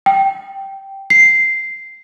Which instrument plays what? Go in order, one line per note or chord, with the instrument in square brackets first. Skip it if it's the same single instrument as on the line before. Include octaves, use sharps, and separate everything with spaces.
[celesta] G5
C7